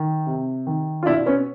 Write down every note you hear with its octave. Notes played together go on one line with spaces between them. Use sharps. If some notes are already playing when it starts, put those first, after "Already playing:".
Already playing: D#3
C3
D#3
F4
B2 D4 E4
B3 C#4